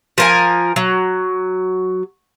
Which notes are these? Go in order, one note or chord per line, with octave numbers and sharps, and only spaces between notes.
F3 A#4 G#5
F#3